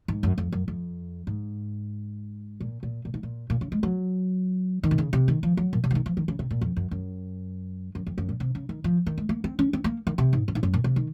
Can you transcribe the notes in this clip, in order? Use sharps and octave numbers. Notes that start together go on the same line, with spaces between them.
G#2
F#2
F2
F#2
F2
G#2
A#2
A#2
A#2
G#2
A#2
A#2
C#3
G#3
F#3
D#3
C3
C#3
C3
D#3
F3
F#3
A#2
C3
F3
D#3
F3
D#3
C#3
C3
A#2
F2
F#2
F#2
F#2
F2
F#2
A#2
C3
C#3
D#3
F3
D#3
G#3
A#3
C4
C#4
C4
A#3
D#3
C3
G#2
F#2
G#2
F#2
A#2
C3
D#3